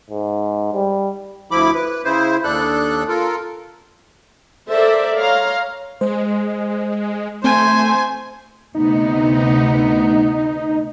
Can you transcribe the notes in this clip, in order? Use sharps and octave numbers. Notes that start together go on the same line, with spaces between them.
G#2
G3
D2 F3 E4 B5 D6
B4
C#3 E4 C5
D#2 D4 A4 F#6
F4 A4 A#4
A4 A#4 C5 D5 E5
C#5 F5 A#5 C6
G#3 C5
A3 C4 C5 G#5 G6
D2 C3 B3 D#4